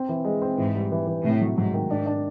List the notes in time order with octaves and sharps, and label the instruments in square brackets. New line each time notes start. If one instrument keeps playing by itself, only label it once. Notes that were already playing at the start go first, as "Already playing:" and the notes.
Already playing: [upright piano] C4
E3
G#3
C4
[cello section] G#2 [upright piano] E3
[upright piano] G3
E3
E3
[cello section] A2 [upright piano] C3
[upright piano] F#3
[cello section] G#2 [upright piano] F#3
[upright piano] D#3
[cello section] G#2 [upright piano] D4
[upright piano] D4